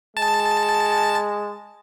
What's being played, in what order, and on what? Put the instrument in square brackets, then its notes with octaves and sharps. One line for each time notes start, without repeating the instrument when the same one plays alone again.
[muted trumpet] G#3 [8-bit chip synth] A5